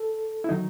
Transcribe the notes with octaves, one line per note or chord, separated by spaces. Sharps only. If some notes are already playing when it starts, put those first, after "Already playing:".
Already playing: A4
E4
D#3 F#3 D#4